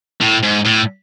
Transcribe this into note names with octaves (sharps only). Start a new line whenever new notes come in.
A2
G#2
A2